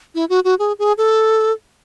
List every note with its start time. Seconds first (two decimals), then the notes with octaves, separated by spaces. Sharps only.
0.15 E4
0.29 F#4
0.44 F#4
0.59 G#4
0.79 G#4
0.98 A4